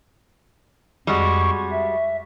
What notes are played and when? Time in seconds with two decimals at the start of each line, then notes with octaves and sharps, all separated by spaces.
1.07 F2 G3 G#3 F#4 C#6
1.71 E5